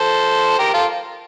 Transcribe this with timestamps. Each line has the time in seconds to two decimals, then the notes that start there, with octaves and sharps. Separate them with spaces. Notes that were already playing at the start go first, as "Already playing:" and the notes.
Already playing: A4 C5
0.59 G4 A#4
0.74 F4 A4